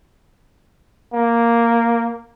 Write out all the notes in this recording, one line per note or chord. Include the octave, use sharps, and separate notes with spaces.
A#3